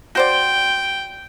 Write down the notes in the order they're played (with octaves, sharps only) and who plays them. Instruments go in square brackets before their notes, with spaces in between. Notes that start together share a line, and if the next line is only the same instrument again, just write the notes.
[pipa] F#4 C5 D5 [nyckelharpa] G5